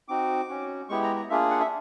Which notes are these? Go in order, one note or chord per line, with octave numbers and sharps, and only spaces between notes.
C4 D#4 F#4 D6
C#4 F#4
G#3 B3 E4 G4 C#6
A#5
A#5
A#3 D4 F4 G#4 E5
F#5
E5